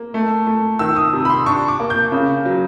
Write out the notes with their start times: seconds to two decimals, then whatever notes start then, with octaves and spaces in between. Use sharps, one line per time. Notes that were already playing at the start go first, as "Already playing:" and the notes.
Already playing: A#3
0.14 A3
0.47 A3
0.79 D#3 E6
0.96 D#6
1.13 C3
1.25 B5
1.30 C6
1.46 D4 C#6
1.68 D6
1.80 A#3
1.90 G6
2.12 C#3
2.45 F#3